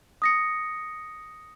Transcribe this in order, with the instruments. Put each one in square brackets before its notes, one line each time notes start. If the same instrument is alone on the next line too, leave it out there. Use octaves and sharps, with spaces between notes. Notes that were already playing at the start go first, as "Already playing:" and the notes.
[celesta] D#6 A#6 C#7